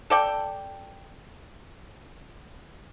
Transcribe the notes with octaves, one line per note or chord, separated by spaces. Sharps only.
A4 D5 G5